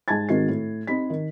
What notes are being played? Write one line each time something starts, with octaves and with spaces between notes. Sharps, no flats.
G#2 G#5 A5 G#6 A6
G#2 D#3 C4 F#4 C7
A2
C4 D#4 B5 B6
D#3